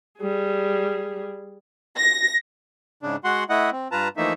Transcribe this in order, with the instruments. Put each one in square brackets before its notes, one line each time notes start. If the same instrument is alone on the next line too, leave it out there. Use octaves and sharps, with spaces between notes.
[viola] G3 G#4
[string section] A#6
[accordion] G#2 C#3 D4
G#3 F#4 F#5 C6
A3 E4 D#5 F#5
C4
G2 F4 B4 A5 A#5
E3 F3 A3 A#3 D#4 E5